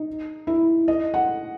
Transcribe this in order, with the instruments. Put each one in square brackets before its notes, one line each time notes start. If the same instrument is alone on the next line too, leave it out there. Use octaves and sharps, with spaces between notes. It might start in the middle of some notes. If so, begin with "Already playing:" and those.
Already playing: [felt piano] D#4
E4
D#5
F#5